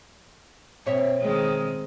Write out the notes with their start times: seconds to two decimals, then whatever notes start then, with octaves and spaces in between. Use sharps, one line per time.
0.86 B2 C4 C#5 E5
1.19 D#3 G#3 C4